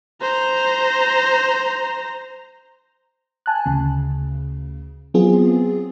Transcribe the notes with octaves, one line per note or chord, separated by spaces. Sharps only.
C5 A#5
G#5 A5 F#6
D2 C#3
F#3 B3 C4 F4 G#4